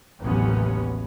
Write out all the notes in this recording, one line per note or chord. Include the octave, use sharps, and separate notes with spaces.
A1 D#2 C3 F#3 B3 C#4